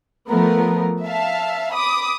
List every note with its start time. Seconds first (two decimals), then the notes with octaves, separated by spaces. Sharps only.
0.28 F3 A3 B3 A#4
1.04 E5 F5 A5
1.72 B5 D6 D#6